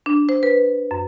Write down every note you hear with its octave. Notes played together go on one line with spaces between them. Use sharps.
D4
C5
B4
F#2